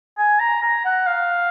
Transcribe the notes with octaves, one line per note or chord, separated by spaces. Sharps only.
G#5
A#5
A#5
F#5
F5